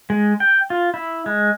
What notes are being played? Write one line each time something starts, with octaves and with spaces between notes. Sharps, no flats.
G#3
G5
F4
E4
G#3